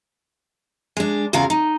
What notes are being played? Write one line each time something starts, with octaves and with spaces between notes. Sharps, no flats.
G#3 D4
E2 C#3 F4 F#4 A#4 F5
D#4